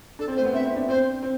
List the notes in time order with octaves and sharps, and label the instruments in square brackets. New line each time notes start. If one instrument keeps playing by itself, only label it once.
[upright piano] D4 [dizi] A4
[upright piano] C4
[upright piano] A3 [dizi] C5
[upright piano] B3
[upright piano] C4 [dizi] E5
[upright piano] C4
D4
[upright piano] C4 [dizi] C5
[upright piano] C4